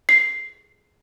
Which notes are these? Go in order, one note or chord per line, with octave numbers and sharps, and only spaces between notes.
C7